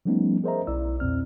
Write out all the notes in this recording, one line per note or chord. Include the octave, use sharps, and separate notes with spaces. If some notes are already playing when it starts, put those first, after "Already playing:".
F3 G3 A3 B3 C#4 D#4
G#4 A#4 C5 D#5 E5 A#5
B1 E4 D5 E6
E2 A#2 C4 F6